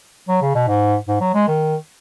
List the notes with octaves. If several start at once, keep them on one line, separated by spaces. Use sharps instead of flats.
F#3
C#3
B2
G#2
G#2
F#3
G#3
D#3